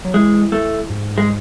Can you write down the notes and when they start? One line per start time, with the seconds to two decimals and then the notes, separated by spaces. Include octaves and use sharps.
0.05 F#3
0.14 E3 G#3
0.52 A3
0.90 G#2
1.18 G#3